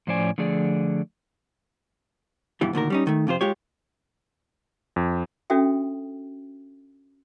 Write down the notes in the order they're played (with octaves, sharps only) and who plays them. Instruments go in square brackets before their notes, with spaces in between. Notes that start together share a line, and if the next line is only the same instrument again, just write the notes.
[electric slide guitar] A2 F3 C#4 C5 D5 G#5
D3 F3 A3 G#4 D5
[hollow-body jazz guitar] G2 B2 E3 G3
D2 A#2 D#3 A#4
G3 C#4 D#4
D#3 A3
F2 C3 F4 C5
G#3 F4 G4 C#5
[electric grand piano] F2
[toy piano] C#4 D4 F#4 A4 E5 G5